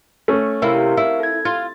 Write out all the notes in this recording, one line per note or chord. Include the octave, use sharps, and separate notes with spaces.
A3 C#4
C3 E4 A#4 F5
E4
A4 G#6
F4 A6